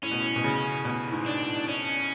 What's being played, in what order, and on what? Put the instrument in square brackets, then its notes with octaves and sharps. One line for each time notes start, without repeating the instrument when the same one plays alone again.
[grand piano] A2 [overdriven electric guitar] C#4
[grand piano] B2
A2
B2
C#3
B2
A2
G#2
[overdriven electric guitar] D4
[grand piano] A2
[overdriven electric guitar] C#4